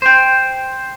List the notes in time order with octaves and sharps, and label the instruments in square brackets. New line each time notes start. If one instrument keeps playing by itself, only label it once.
[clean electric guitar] C5 G5